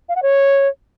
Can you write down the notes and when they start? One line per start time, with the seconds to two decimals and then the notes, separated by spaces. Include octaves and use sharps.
0.09 F5
0.16 F#5
0.23 C#5